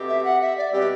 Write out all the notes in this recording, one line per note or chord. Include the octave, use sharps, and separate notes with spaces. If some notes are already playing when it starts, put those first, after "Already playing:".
Already playing: B2 A3 C4 G4
E5
F#5
E5
D5
B2 G3 C4 G4